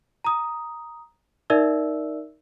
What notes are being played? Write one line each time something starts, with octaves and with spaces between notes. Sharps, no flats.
A#5 D#6
D#4 A#4 D5 E5 E6